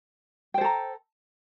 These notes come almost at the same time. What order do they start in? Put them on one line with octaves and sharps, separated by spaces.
G5 C5 A4 A#5